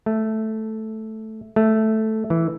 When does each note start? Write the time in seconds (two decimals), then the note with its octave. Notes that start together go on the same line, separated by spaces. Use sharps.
0.06 A3
1.56 A3
2.30 E3